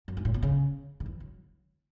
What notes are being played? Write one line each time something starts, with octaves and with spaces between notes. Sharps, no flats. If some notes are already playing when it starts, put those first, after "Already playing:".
F#2
G#2
A2
B2
C#3
D3
E3
F#3